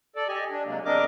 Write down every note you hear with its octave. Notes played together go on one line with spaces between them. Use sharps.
A4 D5
G4 D#5 G#5
D4
C3 F#3 G#3 A#3
E2 C4 D4 A#4 D#5 D6